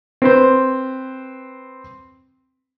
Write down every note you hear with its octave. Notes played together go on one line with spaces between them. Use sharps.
C4 B4 C5